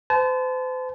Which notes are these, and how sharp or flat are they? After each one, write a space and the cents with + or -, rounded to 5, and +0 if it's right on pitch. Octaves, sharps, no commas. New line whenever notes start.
C5 -40 A5 -30